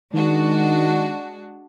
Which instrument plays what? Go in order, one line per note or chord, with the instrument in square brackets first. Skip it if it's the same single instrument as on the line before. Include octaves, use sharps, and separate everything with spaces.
[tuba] D#3 [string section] G#3 D4 F#4